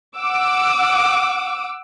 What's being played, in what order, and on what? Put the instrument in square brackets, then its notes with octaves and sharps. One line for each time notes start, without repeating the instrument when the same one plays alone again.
[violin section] F#5 D6 E6